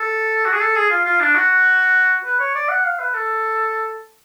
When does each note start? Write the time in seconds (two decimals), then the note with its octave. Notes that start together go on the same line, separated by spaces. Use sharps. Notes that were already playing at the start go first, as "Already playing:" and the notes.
Already playing: A4
0.45 F#4
0.53 G#4
0.61 A4
0.76 G#4
0.90 F4
1.05 F4
1.20 D4
1.35 F#4
2.25 B4
2.40 C#5
2.55 D5
2.69 F#5
2.84 F5
2.99 B4
3.14 A4